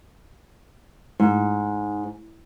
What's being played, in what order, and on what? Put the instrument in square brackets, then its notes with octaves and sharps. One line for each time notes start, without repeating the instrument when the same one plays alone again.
[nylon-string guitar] G#2